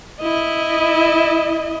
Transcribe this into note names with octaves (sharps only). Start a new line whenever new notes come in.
E4 D#5